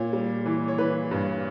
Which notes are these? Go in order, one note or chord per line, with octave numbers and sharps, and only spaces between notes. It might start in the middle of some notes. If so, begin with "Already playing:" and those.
Already playing: A#2 C#5
G3
E3
C#5
E3 B4
G2